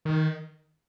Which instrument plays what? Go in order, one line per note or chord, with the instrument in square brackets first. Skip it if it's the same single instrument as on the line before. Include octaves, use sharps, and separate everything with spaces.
[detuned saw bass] D#3